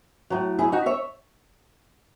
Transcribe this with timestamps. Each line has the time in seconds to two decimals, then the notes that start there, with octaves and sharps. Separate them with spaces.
0.30 A2 F#3
0.59 E4 G#4
0.72 D#4 F#4
0.86 C#5 E5